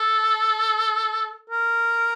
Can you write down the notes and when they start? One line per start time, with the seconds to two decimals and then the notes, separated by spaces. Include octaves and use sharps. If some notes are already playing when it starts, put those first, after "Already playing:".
Already playing: A4
1.50 A#4